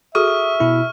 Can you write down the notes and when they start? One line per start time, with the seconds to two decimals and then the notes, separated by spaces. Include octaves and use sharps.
0.15 F#4 G#4 A4 E5 C#6 D#6 F6
0.60 B2 E4